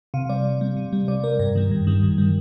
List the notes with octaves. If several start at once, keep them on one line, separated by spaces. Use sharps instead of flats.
C3 F5
G3 D5
C3
G3
C3
G3
C3 D5
G3 A#4
G2 A#4
D#3 G3
G2
D#3 G3
G2
D#3 G3